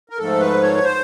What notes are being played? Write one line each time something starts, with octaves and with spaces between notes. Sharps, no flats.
A#4
G#2 F3 A3 A4
B4
C#5
C5